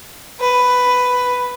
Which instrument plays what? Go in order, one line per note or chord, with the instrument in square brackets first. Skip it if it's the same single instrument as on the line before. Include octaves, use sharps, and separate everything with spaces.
[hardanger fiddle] B4